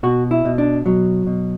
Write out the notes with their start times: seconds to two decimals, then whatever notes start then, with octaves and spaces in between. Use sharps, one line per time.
0.03 B2 F#4
0.31 E4
0.45 B2
0.58 D4
0.86 B2 F#3
1.27 B2